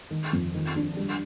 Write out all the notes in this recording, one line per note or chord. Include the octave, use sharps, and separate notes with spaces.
D#3
F2
D#3
D4
G3